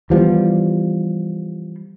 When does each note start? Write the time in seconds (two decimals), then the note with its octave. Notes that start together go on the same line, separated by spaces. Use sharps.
0.10 E3 F3 G3 B3